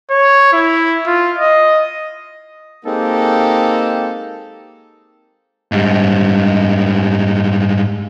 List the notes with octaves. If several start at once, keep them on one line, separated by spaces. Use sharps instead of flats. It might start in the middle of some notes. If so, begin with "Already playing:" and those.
C#5
E4
F4
D#5
G#3 A#3 C4 D#4 G4 A4
G#2 G3